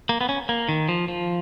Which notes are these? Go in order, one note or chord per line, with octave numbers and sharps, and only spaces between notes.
A#3
B3
C#4
A#3
D#3
F3
F3